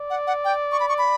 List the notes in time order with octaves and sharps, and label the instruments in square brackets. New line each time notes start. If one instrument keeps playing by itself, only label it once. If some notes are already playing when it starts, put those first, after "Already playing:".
Already playing: [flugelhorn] D5
[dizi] F#5
F#5
G5
C#6
B5
C#6
B5